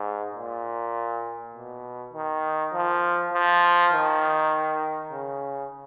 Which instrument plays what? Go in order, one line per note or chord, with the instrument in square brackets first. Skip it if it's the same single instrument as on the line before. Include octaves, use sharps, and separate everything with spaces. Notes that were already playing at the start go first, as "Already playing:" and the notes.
Already playing: [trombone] G#2
A#2
B2
D#3
F3
F3
D#3
C#3